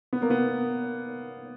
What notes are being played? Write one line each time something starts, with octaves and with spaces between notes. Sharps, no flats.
B3
A#3
B3